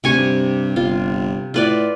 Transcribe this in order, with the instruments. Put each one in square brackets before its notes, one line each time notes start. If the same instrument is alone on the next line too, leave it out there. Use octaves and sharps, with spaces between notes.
[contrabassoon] D2 [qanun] C3 G#5 C#6
[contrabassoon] G2
[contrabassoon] G1 [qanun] F4
[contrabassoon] A2 [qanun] F4 B4 D5